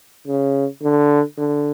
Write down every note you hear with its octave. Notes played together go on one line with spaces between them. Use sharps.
C#3
D3
D3